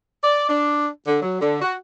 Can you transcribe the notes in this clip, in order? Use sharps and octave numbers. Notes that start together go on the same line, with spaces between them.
D5
D4
D3
F#3
D3
F#4